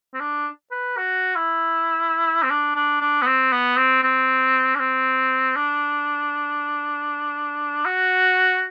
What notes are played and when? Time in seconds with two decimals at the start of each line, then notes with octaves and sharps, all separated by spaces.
0.14 C4
0.20 D4
0.71 B4
0.97 F#4
1.36 E4
2.43 C4
2.50 D4
2.76 D4
3.01 D4
3.22 B3
3.26 C4
3.52 B3
3.77 C4
4.03 C4
4.75 D4
4.79 C4
5.56 D4
7.85 F#4